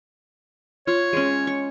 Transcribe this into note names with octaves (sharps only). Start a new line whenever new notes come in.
F4 C#5
G#3 C#4
C#6